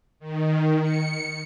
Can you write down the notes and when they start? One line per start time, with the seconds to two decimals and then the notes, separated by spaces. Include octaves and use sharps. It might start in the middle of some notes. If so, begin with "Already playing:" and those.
0.20 D#3
0.82 C#7